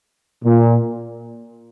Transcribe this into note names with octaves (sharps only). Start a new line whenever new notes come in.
A#2